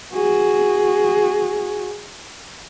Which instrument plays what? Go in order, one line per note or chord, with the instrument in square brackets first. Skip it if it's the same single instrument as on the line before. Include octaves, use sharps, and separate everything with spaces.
[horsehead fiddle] F#4 G#4